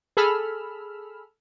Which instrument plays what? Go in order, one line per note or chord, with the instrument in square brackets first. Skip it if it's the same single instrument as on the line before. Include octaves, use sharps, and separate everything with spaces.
[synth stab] G#4 A4 B5 E6 F6